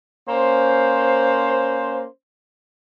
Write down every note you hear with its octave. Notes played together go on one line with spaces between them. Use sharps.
A#3 C#4 C5